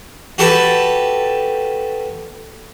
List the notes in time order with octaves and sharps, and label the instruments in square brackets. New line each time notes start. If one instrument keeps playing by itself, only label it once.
[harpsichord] F#4 G4 A4 B4 A5